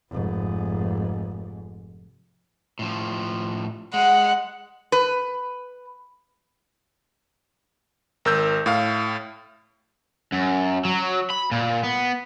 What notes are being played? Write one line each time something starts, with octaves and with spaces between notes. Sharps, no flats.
F1 G#2
A2 F3
G#3 F#5
B4
G#1 A#4 E6 G6
A2 F5 F6
F#2
F#3
B5
A#2
B3